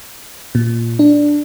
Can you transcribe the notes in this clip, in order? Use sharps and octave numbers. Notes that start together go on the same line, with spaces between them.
A#2
D4